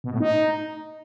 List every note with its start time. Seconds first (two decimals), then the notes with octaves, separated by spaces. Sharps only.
0.04 B2
0.12 A2
0.20 D#4